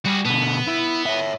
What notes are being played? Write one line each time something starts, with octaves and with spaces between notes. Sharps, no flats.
G3 F#4 G#4
B2 D3 B3
E4
C#5 E5